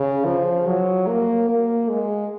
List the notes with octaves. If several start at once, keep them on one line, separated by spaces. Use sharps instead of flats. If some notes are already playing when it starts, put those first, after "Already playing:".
Already playing: C#3
F3
F#3
A#3
A#3
G#3